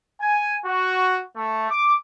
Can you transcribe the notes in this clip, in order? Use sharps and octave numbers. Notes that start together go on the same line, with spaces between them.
G#5
F#4
A3
D6